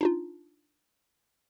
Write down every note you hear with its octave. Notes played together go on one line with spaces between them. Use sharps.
D4 D#4 F4